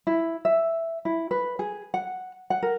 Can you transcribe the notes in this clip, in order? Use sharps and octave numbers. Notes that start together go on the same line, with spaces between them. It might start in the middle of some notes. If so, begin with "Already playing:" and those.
E4
E5
E4
B4
G#4
F#5
F#5
A#4